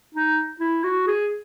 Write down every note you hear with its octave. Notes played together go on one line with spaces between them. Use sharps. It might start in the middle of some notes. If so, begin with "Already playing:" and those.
D#4
E4
F#4
G#4